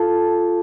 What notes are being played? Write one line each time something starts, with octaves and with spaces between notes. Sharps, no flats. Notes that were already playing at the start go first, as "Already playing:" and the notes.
Already playing: F4 A4